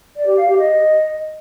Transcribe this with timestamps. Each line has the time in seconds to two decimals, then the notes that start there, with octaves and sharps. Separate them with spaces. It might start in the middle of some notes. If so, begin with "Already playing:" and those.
0.17 D5
0.27 G4
0.37 F5
0.47 G4
0.57 D#5